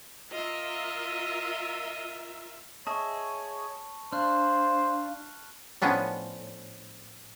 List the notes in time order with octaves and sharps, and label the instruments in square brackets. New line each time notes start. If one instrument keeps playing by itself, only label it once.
[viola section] F4 A#4 E5 [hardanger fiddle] D#5
[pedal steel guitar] G#4 D#5 E5 [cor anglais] C#5 [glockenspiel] A5 C#6
[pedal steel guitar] D4 [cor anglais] C5 [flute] F5 [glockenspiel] F6 F#6
[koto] A2 F3 B3 C#4 D4